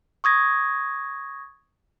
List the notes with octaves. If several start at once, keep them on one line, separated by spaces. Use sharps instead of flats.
C#6 D#6 G#6 A#6